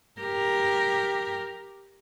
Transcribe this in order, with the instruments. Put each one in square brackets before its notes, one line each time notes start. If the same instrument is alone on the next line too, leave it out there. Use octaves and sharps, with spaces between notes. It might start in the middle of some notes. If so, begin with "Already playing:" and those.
[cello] G4 A#4